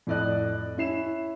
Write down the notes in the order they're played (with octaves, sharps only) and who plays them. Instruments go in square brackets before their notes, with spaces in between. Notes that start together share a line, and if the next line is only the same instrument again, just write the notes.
[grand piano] F2 A2 D5 D#5 F#6
C#4 E4 C7 E7